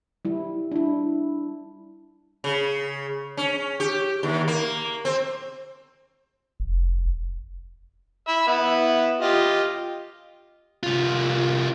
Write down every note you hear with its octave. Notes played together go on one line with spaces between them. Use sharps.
G3 E4
D4 E4
C#3
C#4
G4
D#2
A#3
C4
F1
E5 B5 E6
B3 E4
F4 G4 D#5
C2 F4